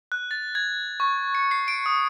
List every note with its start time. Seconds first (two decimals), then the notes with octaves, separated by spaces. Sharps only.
0.12 F#6
0.31 A6
0.55 G#6
1.00 C#6
1.35 C#7
1.51 C7
1.68 D7
1.86 D#6